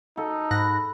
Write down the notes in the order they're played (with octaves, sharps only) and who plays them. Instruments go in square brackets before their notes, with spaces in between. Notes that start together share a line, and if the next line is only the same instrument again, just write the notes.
[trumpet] D#4 [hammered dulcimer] A4
[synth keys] G#2 F#6 A#6 [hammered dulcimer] B5